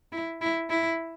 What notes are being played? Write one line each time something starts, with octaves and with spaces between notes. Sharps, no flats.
E4
E4
E4